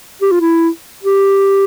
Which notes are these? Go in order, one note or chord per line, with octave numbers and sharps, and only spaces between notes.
G4
F4
E4
G4